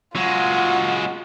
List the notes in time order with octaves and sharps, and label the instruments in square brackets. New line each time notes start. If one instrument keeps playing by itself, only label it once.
[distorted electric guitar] F#3 G#3 [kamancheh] F4 F#5